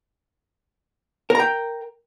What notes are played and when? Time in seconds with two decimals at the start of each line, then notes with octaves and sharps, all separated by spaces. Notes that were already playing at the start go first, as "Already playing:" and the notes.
1.30 A#4
1.35 A#5
1.40 G5